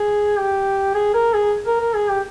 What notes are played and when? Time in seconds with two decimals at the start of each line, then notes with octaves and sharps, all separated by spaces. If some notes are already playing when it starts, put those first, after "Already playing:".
Already playing: G#4
0.38 G4
0.95 G#4
1.14 A#4
1.34 G#4
1.67 A#4
1.81 A#4
1.95 G#4
2.10 G4